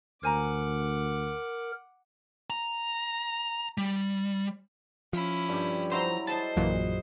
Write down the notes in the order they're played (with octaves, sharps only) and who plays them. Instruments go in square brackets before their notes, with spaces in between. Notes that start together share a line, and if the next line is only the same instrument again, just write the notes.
[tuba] D2 [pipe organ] A#4 [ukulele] C5 G#5 A#5 [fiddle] F#5 D6
[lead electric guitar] A#5
G3
[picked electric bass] F3 [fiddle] C#4 E4
[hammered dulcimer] G2 G4
[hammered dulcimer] F#3 E4 [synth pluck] C5 [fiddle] A#5
[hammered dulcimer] G#4 D#5 [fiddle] C5 [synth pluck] A5
[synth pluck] A#1 A#2 E3 [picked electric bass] F#2 F#3